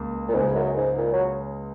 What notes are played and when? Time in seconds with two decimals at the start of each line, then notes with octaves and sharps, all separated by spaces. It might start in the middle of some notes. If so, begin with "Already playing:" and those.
Already playing: C#2 A#3
0.28 A#2
0.34 C#2 G#2 C#3 G#3
0.55 F#2
0.76 G#2
0.97 A#2
1.13 F#3